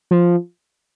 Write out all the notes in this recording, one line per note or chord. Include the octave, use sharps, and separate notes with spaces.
F3